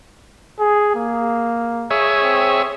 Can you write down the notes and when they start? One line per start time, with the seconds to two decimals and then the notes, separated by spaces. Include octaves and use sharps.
0.59 G#4
0.96 A#3
1.90 G#4 C#5 E5
2.23 C4